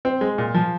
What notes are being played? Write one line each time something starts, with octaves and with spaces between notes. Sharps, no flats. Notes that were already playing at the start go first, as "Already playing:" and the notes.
C4
G#3
A#2
F3